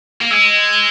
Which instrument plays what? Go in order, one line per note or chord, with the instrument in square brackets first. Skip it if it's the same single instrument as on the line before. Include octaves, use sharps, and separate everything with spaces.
[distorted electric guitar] A#3
[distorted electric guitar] G#3 [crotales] E6
[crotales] G7